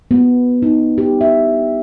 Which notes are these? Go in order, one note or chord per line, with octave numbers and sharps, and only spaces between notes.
B3
D#4
G4
E5